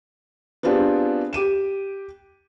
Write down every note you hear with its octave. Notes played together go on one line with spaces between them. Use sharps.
B3 C4 D4 F4 G4 G#4
G4 D6 D#7 E7